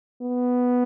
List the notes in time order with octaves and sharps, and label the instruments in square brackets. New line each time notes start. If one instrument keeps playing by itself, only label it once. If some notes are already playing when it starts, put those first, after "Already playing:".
[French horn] B3